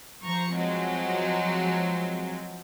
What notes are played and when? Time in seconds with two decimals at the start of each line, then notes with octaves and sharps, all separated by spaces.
0.24 F3 C5 A#5 C#6
0.56 F#3 G#3 C4